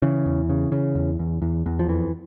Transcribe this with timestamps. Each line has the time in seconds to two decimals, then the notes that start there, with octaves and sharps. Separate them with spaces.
0.02 C#3 E3
0.26 E2
0.50 C#3
0.72 C#3
0.95 E2
1.19 E2
1.42 E2
1.66 E2
1.79 F3
1.88 F2 E3